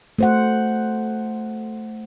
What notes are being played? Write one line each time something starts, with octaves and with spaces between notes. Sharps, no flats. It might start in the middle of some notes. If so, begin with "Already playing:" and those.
A3 C5 F#5